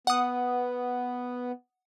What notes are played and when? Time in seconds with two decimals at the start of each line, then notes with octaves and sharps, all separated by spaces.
0.07 B3 F#5 D#6